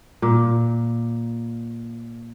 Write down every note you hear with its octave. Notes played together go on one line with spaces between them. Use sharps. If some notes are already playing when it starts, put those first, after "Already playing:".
A#2